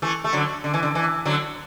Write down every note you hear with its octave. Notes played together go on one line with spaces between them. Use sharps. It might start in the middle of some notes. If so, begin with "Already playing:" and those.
E3 A3
A3
D3 F#3
D3
E3
D3
E3
D3 F#3